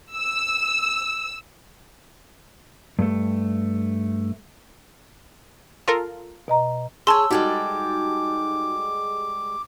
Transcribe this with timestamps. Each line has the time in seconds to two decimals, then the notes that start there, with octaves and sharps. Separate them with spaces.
0.16 E6
2.99 G2 A3
5.88 F4 A4 A#4
6.48 B2 D#5 A#5
7.07 G#4 C#5 A5 C6 E6
7.31 G3 G#3 D#4 F#4 A4 D6